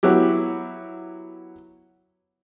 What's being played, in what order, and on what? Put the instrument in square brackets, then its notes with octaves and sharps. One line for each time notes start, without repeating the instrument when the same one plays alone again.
[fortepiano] F#3 B3 E4 G4